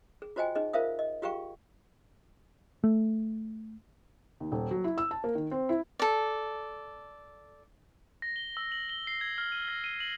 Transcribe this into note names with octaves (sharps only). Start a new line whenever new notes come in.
G#4
F4 F#4 C5 D#5 G5 G#5
D#4 G#4 D#5
F4 A#4 C5 E5 F5 D#6
D#5
F4 G4 G#4 F5 G5 C#6
A3
D#2
D#1
F#3
E4
E6
A5
A#3
D#3
C4
E4
A4 D5
A#6
G7
E6
F#7
G7
C7
G#6
F6
D#7
A#6
D#7
F#7